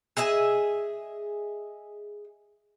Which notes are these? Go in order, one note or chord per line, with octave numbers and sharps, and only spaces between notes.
G#4 D#5 E5 G#5